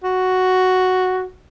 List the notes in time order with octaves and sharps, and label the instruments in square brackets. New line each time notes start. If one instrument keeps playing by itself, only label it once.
[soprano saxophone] F#4